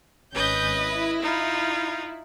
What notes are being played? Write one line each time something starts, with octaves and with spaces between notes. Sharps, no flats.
G#1 C#4 B4 D#5 G6
E4
D#4 F4